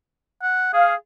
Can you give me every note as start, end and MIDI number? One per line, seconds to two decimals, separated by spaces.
0.42 0.69 78
0.73 0.94 68
0.73 0.93 77